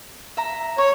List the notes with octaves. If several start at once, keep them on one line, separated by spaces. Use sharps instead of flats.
E5 A#5
C#5 C#6